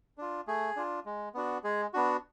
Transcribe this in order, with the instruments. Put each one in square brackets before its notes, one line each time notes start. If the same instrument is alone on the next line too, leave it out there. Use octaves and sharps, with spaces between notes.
[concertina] D4 F4
A3 G#4
D4 F4
G#3
B3 D4 F#4
G#3 G#4
B3 D4 F#4